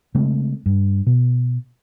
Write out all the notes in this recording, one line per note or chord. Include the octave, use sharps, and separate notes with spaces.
C#3 G#3 A3 C4
G2
B2